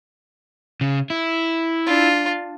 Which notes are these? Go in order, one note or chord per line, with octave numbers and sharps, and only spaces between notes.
C#3
E4
D4 F4